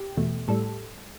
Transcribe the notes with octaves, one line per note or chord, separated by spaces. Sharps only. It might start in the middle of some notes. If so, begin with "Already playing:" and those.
Already playing: G4
E2 B2 A3
A2 G3 A4